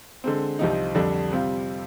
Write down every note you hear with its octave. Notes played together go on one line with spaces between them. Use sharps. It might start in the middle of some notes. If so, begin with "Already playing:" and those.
D3 G#3 C4
C2 C3 F3 C4 D#4
F2 D3 G3 D4
C3 G3 C4 F4